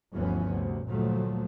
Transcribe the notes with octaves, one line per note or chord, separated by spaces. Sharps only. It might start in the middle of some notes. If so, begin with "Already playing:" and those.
G1 D2 E3 F3 B3 C#4
D2 C3
D2 A#2 F3 F#3 A3